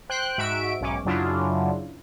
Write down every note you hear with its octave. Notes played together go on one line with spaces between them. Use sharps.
C5 G5 F#6
G#2 F#4 E5 D7
B1 G#2 C#4 D6
F#2 C#3 F#3 D4 E4 F4